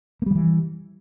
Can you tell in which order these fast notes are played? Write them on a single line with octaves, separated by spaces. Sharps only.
A#3 G3 F3 E3